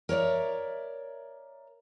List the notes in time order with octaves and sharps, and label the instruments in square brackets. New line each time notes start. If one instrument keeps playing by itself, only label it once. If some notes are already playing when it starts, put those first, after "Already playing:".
[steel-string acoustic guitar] A#4 C#5 D5 E5